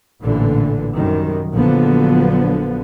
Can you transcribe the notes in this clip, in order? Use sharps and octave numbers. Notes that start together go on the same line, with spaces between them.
A1 A#2 D3 E3
F#2 C3 D#3 G3
A#1 D3 F3 F#3 B3